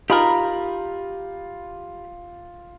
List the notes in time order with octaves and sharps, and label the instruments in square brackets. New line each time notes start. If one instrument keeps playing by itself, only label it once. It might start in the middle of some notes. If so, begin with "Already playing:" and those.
[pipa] D#4 A#4 [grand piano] F4 [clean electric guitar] G4 B5